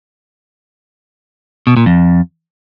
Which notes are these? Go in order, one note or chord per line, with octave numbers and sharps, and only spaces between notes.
B2
A#2
F2